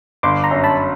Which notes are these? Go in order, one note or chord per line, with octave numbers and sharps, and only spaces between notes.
G1 C6 D6
A#5 C6
F#2
A5 B5